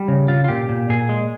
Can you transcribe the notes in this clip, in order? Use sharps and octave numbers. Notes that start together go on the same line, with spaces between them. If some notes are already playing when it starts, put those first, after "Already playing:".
Already playing: G3
C#3
C#3 F4
F4
A#2 G4
A#2
A#2 G#4
G#3